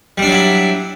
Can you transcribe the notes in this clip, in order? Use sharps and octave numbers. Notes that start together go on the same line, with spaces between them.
F#3 G3 D4 E4